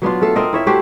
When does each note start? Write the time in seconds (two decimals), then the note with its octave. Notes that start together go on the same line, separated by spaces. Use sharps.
0.02 F#3 B3 D4 F4
0.21 A3 A4 F5
0.36 C4 A#4 D#5
0.53 E4 C#5 E5
0.67 A3 F#4 G4 C5